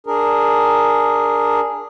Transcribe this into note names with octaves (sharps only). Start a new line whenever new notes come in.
D4 G#4 A#4